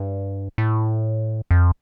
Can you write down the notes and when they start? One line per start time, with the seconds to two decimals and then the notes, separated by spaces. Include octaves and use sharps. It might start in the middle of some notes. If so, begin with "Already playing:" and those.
Already playing: G2
0.58 A2
1.51 F2